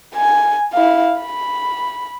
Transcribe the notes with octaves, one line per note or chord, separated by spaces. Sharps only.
G#5
E4 F5
B5